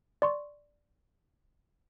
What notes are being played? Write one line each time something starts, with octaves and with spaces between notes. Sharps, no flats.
D5 C6 C#6